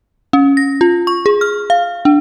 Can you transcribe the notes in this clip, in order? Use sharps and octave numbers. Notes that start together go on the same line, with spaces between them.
C#4
A#6
F4
C#6
G#4
F6
F5
D4